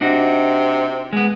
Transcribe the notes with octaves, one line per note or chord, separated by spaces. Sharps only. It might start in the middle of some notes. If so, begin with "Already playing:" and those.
C3 D4 D#4 F#4
G#3 B3